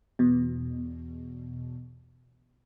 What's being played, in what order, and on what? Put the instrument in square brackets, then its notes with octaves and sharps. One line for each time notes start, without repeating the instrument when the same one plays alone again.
[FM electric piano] E2 B2